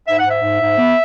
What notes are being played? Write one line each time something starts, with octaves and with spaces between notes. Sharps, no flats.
G#2 E5
F#5
G#2 E5
G#2
G#2
B3